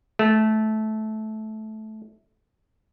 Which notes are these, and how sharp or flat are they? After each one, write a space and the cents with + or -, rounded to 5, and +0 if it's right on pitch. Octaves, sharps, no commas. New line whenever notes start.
A3 -15